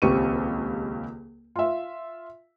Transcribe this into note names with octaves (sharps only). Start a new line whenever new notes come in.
D#1 C#2 C4 G4 C#6 D#7
F4 E5